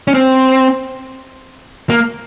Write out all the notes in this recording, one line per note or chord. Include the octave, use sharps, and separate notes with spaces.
C#4
C4
A#3